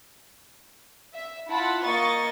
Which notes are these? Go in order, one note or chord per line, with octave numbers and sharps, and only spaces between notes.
E5
E4 F4 F#5 A5 B5
A#3 D#5 C#6 A6